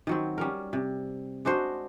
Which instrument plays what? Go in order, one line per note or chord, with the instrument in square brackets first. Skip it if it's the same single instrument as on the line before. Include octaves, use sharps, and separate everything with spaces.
[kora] D#3 F#3 C4
G3 C#4 A#4
C3
G#3 D4 F#4 C5